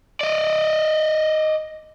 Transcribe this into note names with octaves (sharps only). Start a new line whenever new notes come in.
D5 D#5